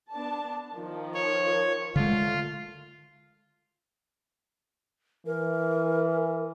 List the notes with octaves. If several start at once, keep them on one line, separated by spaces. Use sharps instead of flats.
B3 D4 A5
D#3 F3
C#5
D3 G#3 A3 F4
E3 A#4